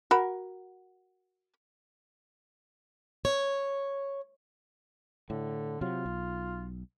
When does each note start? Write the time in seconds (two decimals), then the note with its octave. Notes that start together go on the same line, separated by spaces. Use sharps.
0.11 F#4 A#4 B5
3.25 C#5
5.30 A2 D3
5.81 C3 F#3 F4
6.06 B1